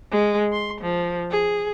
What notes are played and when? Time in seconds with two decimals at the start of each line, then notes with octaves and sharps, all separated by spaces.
0.12 G#3
0.53 C6
0.81 F3
1.30 G#4